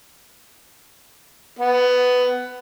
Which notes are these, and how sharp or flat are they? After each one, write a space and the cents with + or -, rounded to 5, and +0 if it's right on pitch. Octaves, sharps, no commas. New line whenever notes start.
B3 +10